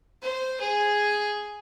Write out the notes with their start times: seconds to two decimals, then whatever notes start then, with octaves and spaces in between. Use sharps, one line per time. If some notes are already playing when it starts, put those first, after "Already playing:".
0.22 C5
0.60 G#4